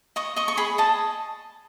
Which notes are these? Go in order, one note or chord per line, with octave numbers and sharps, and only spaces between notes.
D#5 C#6
D#5 C#6
C#6
G#4 B5
D#5 A5